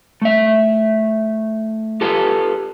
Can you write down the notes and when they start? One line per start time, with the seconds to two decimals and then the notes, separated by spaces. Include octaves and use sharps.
0.22 A3 E5
2.01 F4 G4 A4 B4